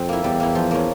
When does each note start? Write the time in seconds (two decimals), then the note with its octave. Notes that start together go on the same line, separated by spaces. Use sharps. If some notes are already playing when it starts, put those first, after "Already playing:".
Already playing: F2 C4
0.09 A#3 E4
0.24 E2 G3
0.40 A#3 E4
0.55 F3
0.71 A#3 C#4